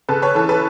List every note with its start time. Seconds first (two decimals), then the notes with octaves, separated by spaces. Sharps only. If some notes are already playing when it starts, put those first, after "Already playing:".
0.09 C#3 A4 B4
0.22 B4 C#5
0.35 E3 A4
0.49 A4 B4